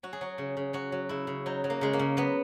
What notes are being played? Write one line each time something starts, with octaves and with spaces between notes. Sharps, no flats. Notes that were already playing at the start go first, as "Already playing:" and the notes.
F#3 F#4
G#4
F#3 F#4
C#3
C#3
F#3 F#4
F#3
C#3 E4
C#3
F#3 D#4
F#3
A#3
C#3 G#3
A#3
C#3
F#3 B3